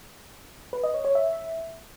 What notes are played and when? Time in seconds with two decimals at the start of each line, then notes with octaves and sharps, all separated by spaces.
0.73 B4
0.83 D#5
0.94 C#5
1.05 C#5
1.15 E5